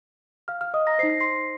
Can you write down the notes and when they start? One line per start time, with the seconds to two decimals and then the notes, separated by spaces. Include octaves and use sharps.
0.48 F5 F6
0.61 F5 F6
0.74 D#5 D#6
0.87 A#5 A#6
0.99 D#4 C5 C7
1.10 A#6
1.20 C6 C7